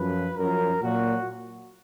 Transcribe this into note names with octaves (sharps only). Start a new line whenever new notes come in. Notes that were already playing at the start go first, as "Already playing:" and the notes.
Already playing: F#2 F3 B4
F#2 F3 A#4
A#2 F#3 F#4